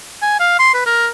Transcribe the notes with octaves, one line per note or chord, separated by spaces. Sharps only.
G#5
F5
C6
B4
A#4